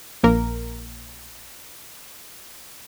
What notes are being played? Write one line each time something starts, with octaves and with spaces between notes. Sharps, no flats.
A#1 A#3 A#4